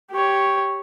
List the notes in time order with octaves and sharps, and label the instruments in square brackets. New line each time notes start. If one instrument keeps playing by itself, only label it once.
[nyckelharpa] G4 C#5